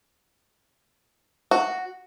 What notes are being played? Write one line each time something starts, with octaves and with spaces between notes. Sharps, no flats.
F#4